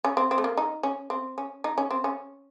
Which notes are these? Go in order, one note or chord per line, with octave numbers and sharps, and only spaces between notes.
C#4
C4
C4
A3
A#3
D#4
C#4
C4
C#4
D#4
C#4
C4
C#4